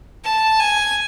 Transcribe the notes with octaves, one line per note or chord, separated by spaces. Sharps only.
A5
G#5